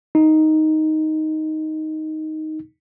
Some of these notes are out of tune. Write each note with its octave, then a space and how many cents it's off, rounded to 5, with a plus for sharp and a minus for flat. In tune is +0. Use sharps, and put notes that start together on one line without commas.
D#4 +5